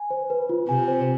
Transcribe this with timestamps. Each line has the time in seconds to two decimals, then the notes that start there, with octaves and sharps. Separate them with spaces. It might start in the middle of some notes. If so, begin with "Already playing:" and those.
Already playing: G#5
0.10 C5
0.30 B4
0.49 F4
0.68 C3 G#5
0.88 C5